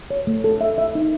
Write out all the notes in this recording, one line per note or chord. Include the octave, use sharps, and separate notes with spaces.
C#5
A3
A4
E5
E5
D#4